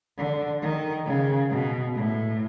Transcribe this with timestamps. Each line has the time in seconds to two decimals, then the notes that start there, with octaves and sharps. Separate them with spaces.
0.18 D3
0.62 D#3
1.06 C#3
1.51 B2
1.96 A2